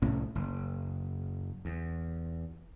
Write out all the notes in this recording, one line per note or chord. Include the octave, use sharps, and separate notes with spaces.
C2 A2 C#4
F#1
E2